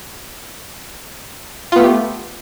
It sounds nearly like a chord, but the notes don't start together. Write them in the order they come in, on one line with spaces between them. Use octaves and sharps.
F4 B3 A3 G4